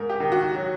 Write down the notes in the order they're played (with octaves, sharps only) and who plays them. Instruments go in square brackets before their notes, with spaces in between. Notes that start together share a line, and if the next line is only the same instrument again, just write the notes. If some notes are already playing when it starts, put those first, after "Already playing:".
Already playing: [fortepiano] G#2 [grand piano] A#4
[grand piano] G4
[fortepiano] D#3
[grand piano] F#4
[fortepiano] F#3